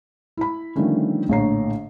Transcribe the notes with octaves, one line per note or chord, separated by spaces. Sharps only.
E4 B5
D3 D#3 F3 G3 A3 C#4
A#1 A2 D3 C#5 A#5 C7